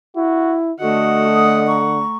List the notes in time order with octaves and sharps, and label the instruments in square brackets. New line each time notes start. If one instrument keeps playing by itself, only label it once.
[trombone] E4 [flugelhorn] F#4
[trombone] D3 [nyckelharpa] A3 F#5 [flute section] F#4 [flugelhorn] D#5
[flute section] D#6
A#5 C#6